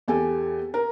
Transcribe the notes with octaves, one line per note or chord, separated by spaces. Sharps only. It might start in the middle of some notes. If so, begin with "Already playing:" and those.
E2 G4 A4 G#5
A#4